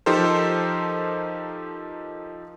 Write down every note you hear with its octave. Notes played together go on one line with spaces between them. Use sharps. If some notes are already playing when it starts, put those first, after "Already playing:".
F3 D#4 G4 A4 A#4 C5